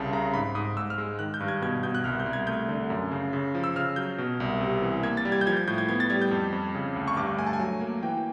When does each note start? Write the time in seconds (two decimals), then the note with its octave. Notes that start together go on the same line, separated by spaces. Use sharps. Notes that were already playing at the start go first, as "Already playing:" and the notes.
Already playing: C2 C#3 A5
0.13 C#3 A#5
0.34 G#2 B5
0.55 G#2 D#6
0.77 G#2 E6
0.90 F6
0.98 G#3
1.19 D#3 F#6
1.34 G6
1.40 G2
1.48 G#6
1.62 B2 G#6
1.83 B2 G6
1.95 F#6
2.04 C2 F6
2.20 G6
2.26 C2
2.33 G#6
2.47 A3 G6
2.69 D3
2.90 F#2
3.11 C#3
3.33 C#3
3.55 F3
3.64 E6
3.76 C#3 F6
3.96 F#3 G6
4.18 B2
4.40 C2
4.61 C3
4.82 E3
5.03 A#3 G#6
5.17 A6
5.25 G3
5.32 G#6
5.41 G6
5.47 F3 G#6
5.57 G6
5.68 A2 G6
5.78 G#6
5.89 B3 G#6
6.00 A6
6.10 G3 G#6
6.22 G6
6.31 F2
6.52 F2
6.75 C#3
6.96 D2
7.08 C#6
7.16 G2 D6
7.38 A3 G#5
7.47 A5
7.53 G#5
7.59 F#3
7.81 A#3
8.03 E3 G5